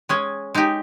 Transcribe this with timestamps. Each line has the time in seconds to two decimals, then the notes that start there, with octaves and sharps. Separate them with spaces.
0.09 G#3 C#4 G#4
0.54 G#3 D#4 G4